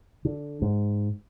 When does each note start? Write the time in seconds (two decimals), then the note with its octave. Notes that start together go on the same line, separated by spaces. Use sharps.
0.25 D3
0.62 G#2